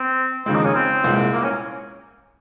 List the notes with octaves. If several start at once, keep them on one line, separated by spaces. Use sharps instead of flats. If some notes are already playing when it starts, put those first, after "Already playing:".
Already playing: C4
D#2 C#3 F3 G#3 C4
D#4
C#4
C4
C2 A#2 G#3
A#3
C#4